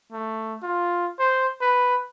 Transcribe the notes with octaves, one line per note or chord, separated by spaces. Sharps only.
A3
F4
C5
B4